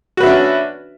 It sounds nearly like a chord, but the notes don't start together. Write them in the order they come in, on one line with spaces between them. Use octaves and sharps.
F#4 B4 E5 D4 C#4